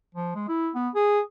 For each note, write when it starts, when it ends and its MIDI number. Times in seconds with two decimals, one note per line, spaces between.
0.15 0.33 53
0.35 0.48 56
0.48 0.70 64
0.75 0.89 59
0.95 1.20 68